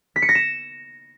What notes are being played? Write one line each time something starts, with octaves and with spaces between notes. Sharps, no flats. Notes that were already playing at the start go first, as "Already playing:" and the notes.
B6
C#7
A#6
E7